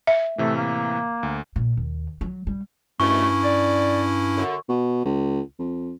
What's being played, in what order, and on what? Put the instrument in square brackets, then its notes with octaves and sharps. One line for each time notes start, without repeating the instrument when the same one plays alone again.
[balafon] E5
[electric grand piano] A2 C3 E3 [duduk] A3
[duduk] A#3
[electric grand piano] D2
[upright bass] A#2
D#2
F#3
G3
[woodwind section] C2 B2 A3 [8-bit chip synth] G2 C#4 E4 [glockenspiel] C#6
[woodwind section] D5
F#2 D3
[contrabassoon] B2
C#2
F2